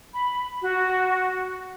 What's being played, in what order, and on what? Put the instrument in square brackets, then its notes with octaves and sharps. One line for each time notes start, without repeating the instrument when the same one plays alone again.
[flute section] B5
F#4